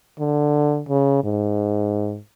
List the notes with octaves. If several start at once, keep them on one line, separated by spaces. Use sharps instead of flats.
D3
C#3
G#2